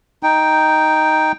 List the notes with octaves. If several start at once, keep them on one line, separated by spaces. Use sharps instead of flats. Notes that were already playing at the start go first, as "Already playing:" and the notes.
D#4 G5